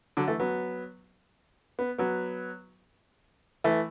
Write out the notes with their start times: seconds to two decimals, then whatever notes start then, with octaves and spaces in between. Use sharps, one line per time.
0.17 D3 F#3
0.28 E3 A3
0.40 F#3 B3
1.79 B3
1.98 F#3 B3
3.64 E3 A3